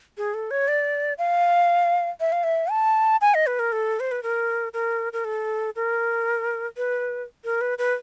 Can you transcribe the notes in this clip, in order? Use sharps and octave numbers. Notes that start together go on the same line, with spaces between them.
G#4
A4
C#5
D5
F5
E5
F5
E5
A5
G#5
D#5
B4
A#4
A4
C5
B4
A#4
A#4
A#4
A4
A#4
B4
A#4
B4
B4